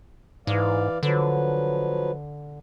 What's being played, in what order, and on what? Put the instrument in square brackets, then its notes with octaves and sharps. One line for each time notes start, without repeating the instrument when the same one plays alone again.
[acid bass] G#2 [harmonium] E3 D5 F5
[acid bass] D3 [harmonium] F3 F#3 B4